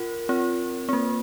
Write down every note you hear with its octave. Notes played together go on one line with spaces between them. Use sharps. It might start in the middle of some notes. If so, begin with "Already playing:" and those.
Already playing: F4 A#4
C4 F4
C4
A#3